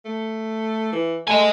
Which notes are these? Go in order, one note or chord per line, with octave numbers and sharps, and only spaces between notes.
A3
E3
A3 D#5 G#5